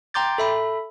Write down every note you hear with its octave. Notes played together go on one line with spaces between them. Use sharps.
G5 A#5 C6 D6 G6 A6
A4 E5 B5